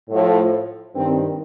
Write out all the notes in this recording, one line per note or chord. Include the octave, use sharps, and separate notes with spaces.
A2 F3
G2 D#3 C4